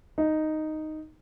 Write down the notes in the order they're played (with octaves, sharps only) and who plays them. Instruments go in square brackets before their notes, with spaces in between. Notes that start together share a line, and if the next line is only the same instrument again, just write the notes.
[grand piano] D#4